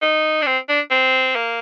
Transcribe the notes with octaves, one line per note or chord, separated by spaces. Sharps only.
D#4
D4
C4
D4
C4
A#3